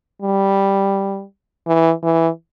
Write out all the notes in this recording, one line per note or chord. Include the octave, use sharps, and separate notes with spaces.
G3
E3
E3